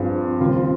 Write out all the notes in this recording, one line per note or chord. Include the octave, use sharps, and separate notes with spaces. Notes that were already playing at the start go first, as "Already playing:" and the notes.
Already playing: G2 F3 C4 F4 G#4
D#2 C#3 G3 C4 F4